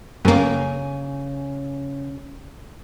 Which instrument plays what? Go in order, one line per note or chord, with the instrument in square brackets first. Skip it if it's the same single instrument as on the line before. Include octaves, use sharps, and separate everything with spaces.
[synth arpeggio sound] F#2 A#3 [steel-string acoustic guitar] C#3 G#5